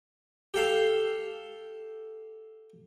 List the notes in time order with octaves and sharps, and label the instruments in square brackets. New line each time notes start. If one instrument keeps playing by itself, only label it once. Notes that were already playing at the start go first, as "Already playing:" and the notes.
[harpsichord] G4 A4 F5 A5